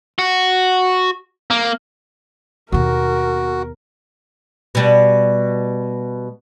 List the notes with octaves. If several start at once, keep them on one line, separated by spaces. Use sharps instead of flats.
F#4
A#3
D#2 B2 F#4 A#4
B2 G3